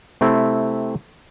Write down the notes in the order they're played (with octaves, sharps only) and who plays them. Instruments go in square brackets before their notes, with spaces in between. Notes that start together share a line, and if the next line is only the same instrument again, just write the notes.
[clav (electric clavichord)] C3 A3 C4 E4